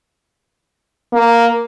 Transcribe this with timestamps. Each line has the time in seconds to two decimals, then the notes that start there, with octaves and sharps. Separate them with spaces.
1.13 A#3